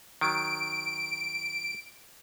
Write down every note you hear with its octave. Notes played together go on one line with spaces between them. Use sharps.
D#3 F#3 D7